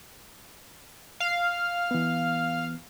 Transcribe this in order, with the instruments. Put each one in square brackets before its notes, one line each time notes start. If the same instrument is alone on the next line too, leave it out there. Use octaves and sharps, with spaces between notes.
[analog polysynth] F5
[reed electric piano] E3 B3